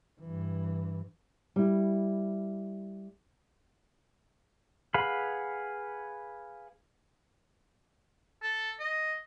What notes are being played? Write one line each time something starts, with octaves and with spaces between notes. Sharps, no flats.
G2 E3
G3 E4
G#4 B4 F5 F#5 B5
A4
D#5